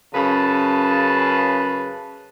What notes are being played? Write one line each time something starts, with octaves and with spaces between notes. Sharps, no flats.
F#2 C#3 B4 A5